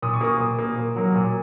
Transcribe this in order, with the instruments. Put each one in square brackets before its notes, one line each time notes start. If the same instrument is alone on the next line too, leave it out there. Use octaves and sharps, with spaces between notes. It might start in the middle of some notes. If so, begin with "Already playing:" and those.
[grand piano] A#2 D#6
C#6
A#3 D#6
A#2
A#3
A#2
F#3 A#3
A#2